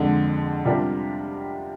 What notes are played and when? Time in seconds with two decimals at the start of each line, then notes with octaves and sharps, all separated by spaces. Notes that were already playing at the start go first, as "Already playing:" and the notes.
Already playing: F2 D3 G#3 D4
0.65 C3 G3 D4 F4 A#4